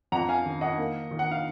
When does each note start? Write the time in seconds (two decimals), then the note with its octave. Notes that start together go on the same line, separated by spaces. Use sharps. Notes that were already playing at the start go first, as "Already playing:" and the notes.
0.12 F2 F#5 A#5
0.29 F5 G#5
0.45 D#3
0.61 D#5 F#5
0.78 A#3
1.11 D#3
1.19 F#5
1.31 F5